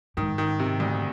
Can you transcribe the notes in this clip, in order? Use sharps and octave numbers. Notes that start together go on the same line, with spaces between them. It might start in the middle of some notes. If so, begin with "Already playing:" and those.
G#2 D#3
D#3
C3
D2